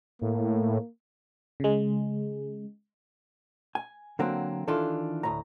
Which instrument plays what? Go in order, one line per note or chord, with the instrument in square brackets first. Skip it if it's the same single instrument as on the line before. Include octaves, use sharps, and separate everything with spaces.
[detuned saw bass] A2 [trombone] A#3
[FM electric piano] C#3 G#3
[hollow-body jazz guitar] G#5
D3 F#3 A#3 C4
D#3 E3 D4 F4 A4
D2 A2 A#5